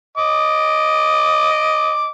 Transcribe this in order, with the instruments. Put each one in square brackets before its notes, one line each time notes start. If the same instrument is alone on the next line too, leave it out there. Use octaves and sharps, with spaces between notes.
[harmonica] D#5 D6